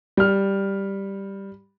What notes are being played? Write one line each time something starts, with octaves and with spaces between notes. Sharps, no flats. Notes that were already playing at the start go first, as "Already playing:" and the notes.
G3 F6